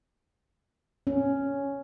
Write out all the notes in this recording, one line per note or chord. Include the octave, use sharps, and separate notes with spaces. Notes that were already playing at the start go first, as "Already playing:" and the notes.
C#4